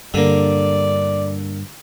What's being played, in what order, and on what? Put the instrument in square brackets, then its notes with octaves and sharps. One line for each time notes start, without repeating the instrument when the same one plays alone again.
[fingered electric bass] G2 [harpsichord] D3 A#3 [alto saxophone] D5